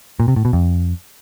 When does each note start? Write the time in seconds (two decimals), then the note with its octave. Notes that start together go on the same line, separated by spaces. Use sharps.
0.20 A#2
0.28 C3
0.36 A2
0.45 B2
0.53 F2